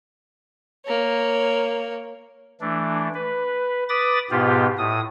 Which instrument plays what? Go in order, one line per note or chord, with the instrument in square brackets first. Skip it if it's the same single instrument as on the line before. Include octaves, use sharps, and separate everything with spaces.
[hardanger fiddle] A#3 C#5
[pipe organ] E3 A3 D4
B4
B4 B5 D6 D#6 A6
G#2 B2 B3 F4 G4
A2 D#6